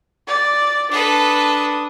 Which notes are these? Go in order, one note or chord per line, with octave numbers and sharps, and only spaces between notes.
D5
D4 A4 B4 D#6